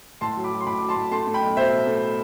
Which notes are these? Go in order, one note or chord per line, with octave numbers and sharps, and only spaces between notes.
A2 A5 C6
F#3
B5 D6
F#3
C6
A2 B5 D6
F#3 D6
A5 C6
A2
A3 A5 C6
A3
G5 B5
B1
B2 C5 E5
B2
A3